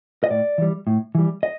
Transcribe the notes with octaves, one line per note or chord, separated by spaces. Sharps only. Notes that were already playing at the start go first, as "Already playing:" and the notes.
D#5
A2 D5
E3 G3
A2
E3 G3
D#5